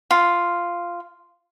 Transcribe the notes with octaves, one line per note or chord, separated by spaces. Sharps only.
F4